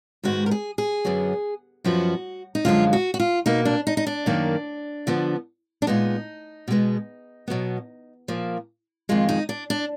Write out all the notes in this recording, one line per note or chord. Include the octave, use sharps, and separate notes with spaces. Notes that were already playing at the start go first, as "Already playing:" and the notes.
G#2 D#3 G#3 B3 F#4
A#4
G#4
G#4
F#2 D3 F#3 B3
F#2 F3 B3 F#4
D#4
F#2 D3 F3 G#3 F4
F#4
F#4
F4
B2 A#3 D#4
D4
D#4
D#4
D4
F#2 D#3 A#3
D3 F3 B3
D4
A#2 G#3 B3 D#4
B2 G#3 B3
B2 F#3 B3
A#2 F3 A#3
F2 D#3 G#3 F4
D#4
D4
D4